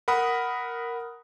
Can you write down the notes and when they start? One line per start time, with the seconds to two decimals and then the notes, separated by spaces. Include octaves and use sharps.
0.08 A#4 F#5 B5 D#6